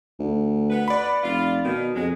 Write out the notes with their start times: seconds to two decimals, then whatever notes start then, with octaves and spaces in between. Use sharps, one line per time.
0.19 D2
0.70 B3 B4
0.88 D5 B5
1.23 F1 F4
1.64 B2 D#3
1.95 F2 F#3 G#3